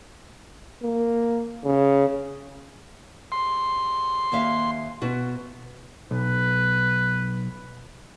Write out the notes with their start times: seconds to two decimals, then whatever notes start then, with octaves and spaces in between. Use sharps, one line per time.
0.83 A#3
1.64 C#3
3.32 C6
4.32 D#2 E5 F5
5.01 B2 F#4
6.11 B1 B4